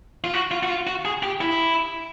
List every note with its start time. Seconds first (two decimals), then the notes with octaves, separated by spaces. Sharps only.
0.24 F4
0.34 F#4
0.51 F4
0.63 F#4
0.69 F4
0.87 F#4
1.05 G#4
1.23 G4
1.41 E4